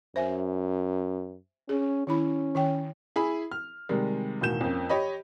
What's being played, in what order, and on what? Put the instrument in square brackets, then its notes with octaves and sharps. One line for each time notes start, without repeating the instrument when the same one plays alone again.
[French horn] F#2 [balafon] C5 E5 G#5
[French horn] C#4 [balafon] G#4
[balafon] D#3 E4 B5 [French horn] C#4
[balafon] D#3 C#5 G5
[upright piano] E4 G#4 B5
F6
C3 D#3 G3 G#3
E1 A2 D#3 F#4 G6 E7
F2 A#3 C#4
G4 C#5 D#5 B5